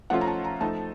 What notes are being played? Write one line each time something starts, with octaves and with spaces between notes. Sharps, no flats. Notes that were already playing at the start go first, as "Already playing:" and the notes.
F3 A3 C#4 F4 F#5
A#5
A5
A#5
F3 A3 D#4 A5